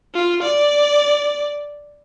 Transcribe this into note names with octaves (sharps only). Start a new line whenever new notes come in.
F4
D5